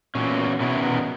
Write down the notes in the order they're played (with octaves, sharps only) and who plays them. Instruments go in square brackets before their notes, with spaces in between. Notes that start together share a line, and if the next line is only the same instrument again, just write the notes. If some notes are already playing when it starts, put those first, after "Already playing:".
[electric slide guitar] E2 D#3 F#3 C#4 [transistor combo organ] A#2
[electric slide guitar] E2 D#3 F#3 C#4 E4 [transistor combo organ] B2
[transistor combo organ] B2